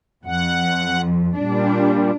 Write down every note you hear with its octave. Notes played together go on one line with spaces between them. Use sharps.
F2 F#5
A#2 G3 D4